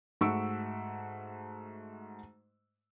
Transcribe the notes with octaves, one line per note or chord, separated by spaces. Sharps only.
G#2 A3 F#4 C#6 E6 D7